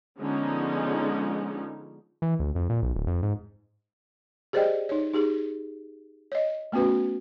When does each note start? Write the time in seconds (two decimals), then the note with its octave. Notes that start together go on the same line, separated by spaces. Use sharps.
0.20 D3 F3 G#3 B3 C#4 D#4
2.22 E3
2.39 D2
2.55 F2
2.69 A#2
2.83 B1
2.96 D1
3.07 F2
3.23 G#2
4.53 G4 G#4 C5 D5 D#5 G5
4.89 D#4 C#5
5.13 D#4 G4 G#4
6.32 C#5 D#5
6.72 A3 B3 C#4 F#4 B4